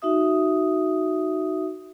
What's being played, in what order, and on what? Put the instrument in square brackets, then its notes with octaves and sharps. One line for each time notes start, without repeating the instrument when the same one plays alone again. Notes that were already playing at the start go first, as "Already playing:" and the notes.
[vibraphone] D#4 F#4 E5 D#6